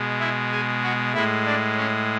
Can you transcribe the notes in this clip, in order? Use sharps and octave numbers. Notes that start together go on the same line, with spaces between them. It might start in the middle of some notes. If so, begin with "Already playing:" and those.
Already playing: B2 G#3
E4
G#4
F#4
A2 G#3 E4
D4
C#4